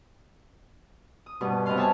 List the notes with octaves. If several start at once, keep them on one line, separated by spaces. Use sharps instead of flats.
D#6
G2 B2
C3 B3 D#5 F5 C6
C#5 E5 F5 G#5 A5 C6